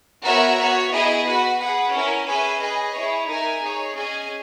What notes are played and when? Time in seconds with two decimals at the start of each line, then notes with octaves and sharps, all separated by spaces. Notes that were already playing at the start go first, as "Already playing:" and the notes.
0.23 B3 F#4 A#4 C#5 E5
0.58 B3 F#4 C#5
0.91 B3 E4 G#4 D#5 G#5
1.24 F#4 B4 F#5
1.58 G#4 B4 F#5
1.92 C#4 E4 A#4
2.26 C#4 G#4 B4 E5 G#5
2.60 G#4 B4 D#5 G#5
2.94 E4 G#4 C#5
3.27 D#4 A#4 E5 G#5
3.60 D#4 G#4 C#5
3.95 C#4 G#4 D#5 G#5